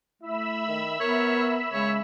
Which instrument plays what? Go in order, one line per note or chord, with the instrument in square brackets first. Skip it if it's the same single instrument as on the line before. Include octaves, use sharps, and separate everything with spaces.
[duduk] A3 [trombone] E4 [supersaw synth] E5 B5 E6
[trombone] D#3
[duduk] B3 [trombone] A#4 [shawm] C#5
[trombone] C#3 [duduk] G#3 [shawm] C#5